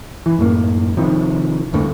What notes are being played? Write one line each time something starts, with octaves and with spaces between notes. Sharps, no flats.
E3
F#2 A2 A#3
C3 D#3 F3
D2 G2 D3 A3